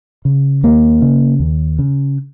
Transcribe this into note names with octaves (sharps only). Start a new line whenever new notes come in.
C#3
D#2 A#3
C#3
D#2
C#3